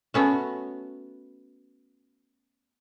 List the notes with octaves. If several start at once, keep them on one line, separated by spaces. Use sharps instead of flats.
A3 B3 C#4 F#4